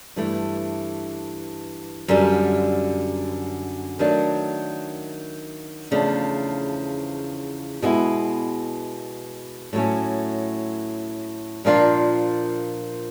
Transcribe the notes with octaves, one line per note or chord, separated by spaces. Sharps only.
G2 E3 A3
F#2 D3 G3
D#3 F#3 A3 D4
E2 C#3 F3 A3 D4
B2 G#3 B3 E4
A2 F#3 A3 C#4
A#2 F3 A#3 D4 F4